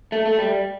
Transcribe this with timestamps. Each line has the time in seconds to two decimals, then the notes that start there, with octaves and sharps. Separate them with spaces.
0.12 A3
0.26 A3
0.39 G3